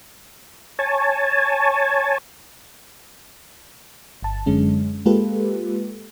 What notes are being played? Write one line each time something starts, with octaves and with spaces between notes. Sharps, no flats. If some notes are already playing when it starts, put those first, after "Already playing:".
C#5 G#5 A5
G1 A5
F#2 D3 G#3 C#4
G#3 A#3 F4 G4 A4 B4